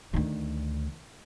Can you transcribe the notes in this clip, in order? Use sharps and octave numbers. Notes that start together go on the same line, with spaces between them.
D2 D#3